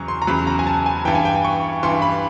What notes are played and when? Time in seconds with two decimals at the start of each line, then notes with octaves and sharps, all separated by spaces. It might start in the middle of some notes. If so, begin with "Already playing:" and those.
Already playing: E2 C#3 F#3 A#5 C#6
0.08 C6
0.22 A#5
0.27 E2 C#3 F#3 B5
0.47 A#5
0.59 G#5
0.67 A5
0.86 G#5
1.05 G2 E3 G5
1.15 G#5
1.25 G5
1.45 C#6
1.83 G2 E3 C6
2.02 B5